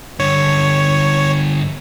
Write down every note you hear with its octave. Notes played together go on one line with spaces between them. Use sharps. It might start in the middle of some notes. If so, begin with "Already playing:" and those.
G2 D3 C#5